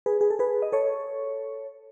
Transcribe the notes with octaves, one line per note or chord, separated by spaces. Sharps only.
G#4 B4
G#4
A4
G#4 B4
D#5
A4 C#5